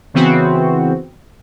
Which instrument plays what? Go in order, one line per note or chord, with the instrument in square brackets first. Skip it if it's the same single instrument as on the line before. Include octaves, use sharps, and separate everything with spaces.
[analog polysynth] C#3 E3 B3 C4 F#4